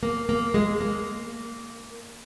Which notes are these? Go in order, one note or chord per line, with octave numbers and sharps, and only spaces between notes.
A#3
A#3
G#3
A#3